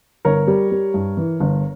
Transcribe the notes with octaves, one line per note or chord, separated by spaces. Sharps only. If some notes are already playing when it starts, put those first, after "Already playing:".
G1 A#4 C#5
G3
G3
G2
E3
G1